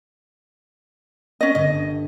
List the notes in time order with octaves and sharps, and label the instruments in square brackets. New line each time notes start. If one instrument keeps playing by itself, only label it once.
[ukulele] C#4 D#5
[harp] G1 [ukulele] D#5